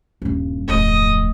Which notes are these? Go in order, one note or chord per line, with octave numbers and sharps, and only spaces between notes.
D#1 G2
D1 F2 D#5